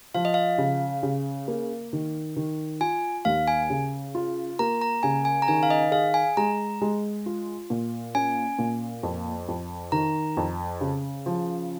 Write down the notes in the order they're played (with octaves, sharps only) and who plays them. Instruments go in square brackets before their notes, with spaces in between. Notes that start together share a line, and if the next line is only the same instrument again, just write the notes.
[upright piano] F3 [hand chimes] F5
[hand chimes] D#5
F5
[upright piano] C#3
C#3
A#3
D#3
D#3
[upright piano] F4 [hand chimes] G#5
[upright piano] D#2 [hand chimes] F5
[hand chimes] G#5
[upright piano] C#3
F4
[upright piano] A#3 [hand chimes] A#5
[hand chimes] A#5
[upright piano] C#3 [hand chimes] G#5
[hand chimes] G#5
A#5
[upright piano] D#3 [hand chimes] G#5
[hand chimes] F5
D#5
[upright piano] G#4 [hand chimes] F5
[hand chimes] G#5
[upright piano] G#3 [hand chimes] A#5
[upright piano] G#3
F4
A#2
[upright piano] C#4 [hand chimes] G#5
[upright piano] A#2
F2
F2
[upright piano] D#3 [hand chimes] A#5
[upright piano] F2
C#3
F3